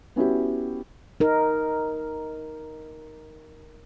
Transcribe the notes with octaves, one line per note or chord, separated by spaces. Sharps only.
B3 C#4 E4 F#4 G4
D#4 A#4